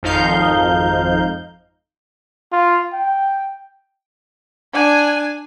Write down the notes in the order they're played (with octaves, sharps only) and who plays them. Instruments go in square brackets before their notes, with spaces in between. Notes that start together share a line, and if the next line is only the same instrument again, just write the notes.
[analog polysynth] G#1 F2 F3 D#4 F5 G6
[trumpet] F4
G5
[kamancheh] D4 G#5